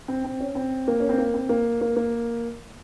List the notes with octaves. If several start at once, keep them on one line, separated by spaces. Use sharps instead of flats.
C4
C4
C#4
C4
A#3
C#4
C4
A#3
C4
A#3
A#3
A#3